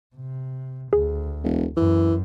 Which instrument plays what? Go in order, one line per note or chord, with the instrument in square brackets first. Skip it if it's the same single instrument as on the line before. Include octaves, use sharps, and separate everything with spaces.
[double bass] C3
[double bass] D2 [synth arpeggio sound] G#4
[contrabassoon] E1
[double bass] F#2 [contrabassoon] E3